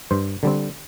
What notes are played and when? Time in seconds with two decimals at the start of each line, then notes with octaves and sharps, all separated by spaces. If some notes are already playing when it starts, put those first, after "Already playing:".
0.11 G2 C5
0.43 D3 G3 C4